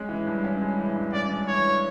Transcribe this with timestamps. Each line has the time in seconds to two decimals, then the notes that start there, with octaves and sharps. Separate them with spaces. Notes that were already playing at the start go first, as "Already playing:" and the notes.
Already playing: G#3 C#4
0.09 E3
0.27 G2
0.44 C#4
0.61 G#3
0.79 E3
0.96 G2
1.13 C#4 D5
1.31 G#3
1.48 E3 C#5